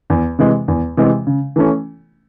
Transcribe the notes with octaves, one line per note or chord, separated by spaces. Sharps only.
E2
C3 E3 G#3
E2
C3 E3 G#3
C#3
E3 A3 C#4